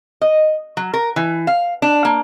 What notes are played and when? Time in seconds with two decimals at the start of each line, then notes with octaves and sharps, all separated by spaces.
0.21 D#5
0.77 F#3
0.94 A#4
1.16 E3
1.47 F5
1.82 D4
2.05 A#3